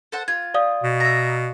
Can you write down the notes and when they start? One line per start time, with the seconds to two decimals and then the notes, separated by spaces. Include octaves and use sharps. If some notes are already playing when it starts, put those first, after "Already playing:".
0.12 A4 C5 F#5
0.28 F4 G#6
0.54 D5 F5 D#6
0.84 B2
1.00 E5 A#5